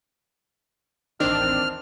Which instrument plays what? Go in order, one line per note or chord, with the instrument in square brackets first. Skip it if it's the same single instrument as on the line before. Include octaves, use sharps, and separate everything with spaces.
[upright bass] A1 D#2 [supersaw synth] D#3 C4 D4 [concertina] F6